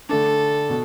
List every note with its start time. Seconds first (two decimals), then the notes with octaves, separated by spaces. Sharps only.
0.09 D3 A3 D4 A4
0.70 B2